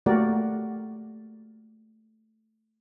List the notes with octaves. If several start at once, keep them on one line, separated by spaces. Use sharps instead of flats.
A3 A#3 F#4 G4 A#4 D5